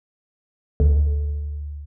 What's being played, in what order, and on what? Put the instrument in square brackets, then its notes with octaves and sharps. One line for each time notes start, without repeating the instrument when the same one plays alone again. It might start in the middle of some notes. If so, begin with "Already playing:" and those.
[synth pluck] D2